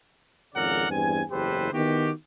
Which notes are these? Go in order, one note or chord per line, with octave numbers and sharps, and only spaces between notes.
G#1 F2 C#3 A#4 D5 F#5
E2 G2 C4 G#5
F#1 E2 G4 A4 B4 C5
D#3 B3 E4 F#4 G4